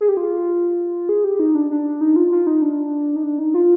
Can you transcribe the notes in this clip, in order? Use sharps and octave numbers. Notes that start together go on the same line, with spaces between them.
G#4
G4
F4
G#4
G4
D#4
D4
D4
D#4
F4
F4
D#4
D4
D#4
D4
D#4
F4